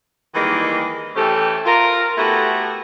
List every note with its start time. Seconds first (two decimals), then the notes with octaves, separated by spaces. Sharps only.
0.35 D#3 E3 G3 G#3 A#3 D#4
1.15 E3 A3 C4 C#4 G4 A4
1.66 F4 A#4
2.18 A3 B3 E4 F#4 G4 A4